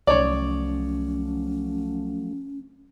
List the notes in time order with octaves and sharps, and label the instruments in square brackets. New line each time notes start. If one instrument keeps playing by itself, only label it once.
[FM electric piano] C2 [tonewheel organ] F3 F#3 A3 [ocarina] C#4 [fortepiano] C#5 D5